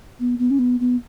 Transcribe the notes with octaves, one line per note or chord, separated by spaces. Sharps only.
B3
B3
C#4
B3
B3